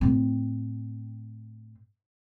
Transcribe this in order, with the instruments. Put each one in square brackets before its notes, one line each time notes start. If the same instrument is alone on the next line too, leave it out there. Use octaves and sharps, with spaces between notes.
[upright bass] A2 C4